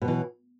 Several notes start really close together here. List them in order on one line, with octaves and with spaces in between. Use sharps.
B2 F#3 E3